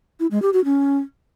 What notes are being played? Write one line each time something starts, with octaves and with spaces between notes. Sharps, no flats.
E4
G#3
G4
F#4
C#4